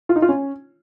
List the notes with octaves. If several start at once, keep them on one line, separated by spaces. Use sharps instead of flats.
F4
D#4
F4
C#4